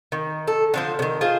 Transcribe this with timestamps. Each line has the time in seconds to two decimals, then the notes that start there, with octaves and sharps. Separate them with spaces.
0.12 D#3
0.47 A4
0.74 D3 F3 C5
0.99 C3 D#3
1.21 F4 G#4 C5